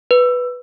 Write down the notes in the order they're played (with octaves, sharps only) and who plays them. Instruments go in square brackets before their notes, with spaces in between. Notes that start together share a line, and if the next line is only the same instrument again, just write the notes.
[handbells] B4